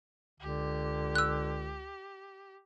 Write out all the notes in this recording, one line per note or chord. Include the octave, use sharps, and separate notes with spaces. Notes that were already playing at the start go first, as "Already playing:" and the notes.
C#2 D3 G4
E6 F#6